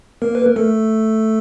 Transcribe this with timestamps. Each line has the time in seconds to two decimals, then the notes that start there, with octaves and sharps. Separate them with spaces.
0.22 A#3 A#4
0.35 B4
0.46 A#4
0.56 A3 A4